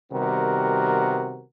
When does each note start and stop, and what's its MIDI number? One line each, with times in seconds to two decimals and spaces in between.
0.12 1.43 48
0.12 1.43 51
0.12 1.43 55
0.12 1.43 59
0.12 1.43 66
0.12 1.43 70